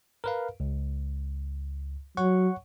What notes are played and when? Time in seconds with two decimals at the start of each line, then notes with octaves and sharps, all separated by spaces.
0.24 A#4 B4 F5
0.60 C#2
2.17 F#3 C#5 F#5 C#6